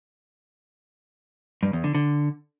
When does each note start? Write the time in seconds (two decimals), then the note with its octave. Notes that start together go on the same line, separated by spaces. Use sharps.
1.63 G2
1.73 E2
1.84 D3
1.95 D3